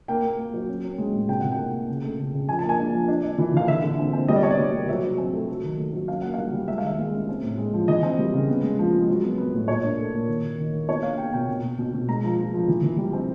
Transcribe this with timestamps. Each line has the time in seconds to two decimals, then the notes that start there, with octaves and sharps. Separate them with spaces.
0.08 A#3 G5
0.24 A#3
0.39 A#3
0.54 F#3
0.68 C#4
0.83 C#4
0.98 G#3
1.14 A2
1.28 C3 G5
1.40 C3 F#5
1.52 G5
1.59 A#3
1.73 A#3
1.89 C#3
2.04 A3
2.19 C#3
2.34 C#3
2.49 F3 G#5
2.59 A5
2.64 A#3 G#5
2.79 D4
2.93 F3
3.08 D4
3.23 D4
3.38 E3
3.54 E3 F5
3.68 D3 E5
3.84 D3
3.99 C4
4.13 C4
4.28 G3 D#5
4.36 D5
4.43 B3 C#5
4.51 D5
4.59 G3
4.74 G3
4.88 F#3 E5
5.03 F#3
5.18 C4
5.33 A3
5.48 F#3
5.63 D#3
5.78 A3
5.93 F#3
6.08 C#4 F5
6.22 A#3 F#5
6.34 G3 F5
6.53 G3
6.68 G#3 E5
6.78 F5
6.83 D#3 E5
6.99 G#3
7.14 C#4
7.29 C4
7.43 A2
7.58 G#3
7.73 F3
7.88 E3 D#5
8.03 C4
8.19 G3
8.34 C#3
8.48 B3
8.63 G#3
8.79 F3
8.93 G#3
9.08 F#3
9.24 B3
9.38 B3
9.54 A2
9.68 A#2 C#5
9.83 D4
9.98 A3
10.14 A#2
10.28 D#3
10.44 D#3
10.58 D#3
10.73 A#3
10.88 B3 C#5
11.03 D4 F5
11.18 B3 G5
11.33 B2 G5
11.48 B2
11.63 B2
11.78 B2
11.94 B2
12.08 G#3 A#5
12.24 F3
12.38 F3
12.54 F3
12.68 E3
12.83 E3
12.98 G3
13.13 C4